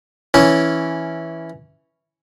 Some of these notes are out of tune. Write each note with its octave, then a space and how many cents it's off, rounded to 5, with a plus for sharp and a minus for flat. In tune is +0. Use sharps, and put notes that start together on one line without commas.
E3 +0 C#4 +0